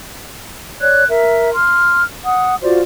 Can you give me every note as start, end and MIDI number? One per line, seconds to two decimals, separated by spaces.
0.80 1.04 73
0.80 1.04 74
0.80 1.04 90
0.80 1.04 92
1.08 1.52 70
1.08 1.52 76
1.53 2.02 84
1.53 2.02 89
2.24 2.55 78
2.24 2.55 87
2.62 2.80 65
2.62 2.80 66
2.62 2.80 72
2.62 2.80 74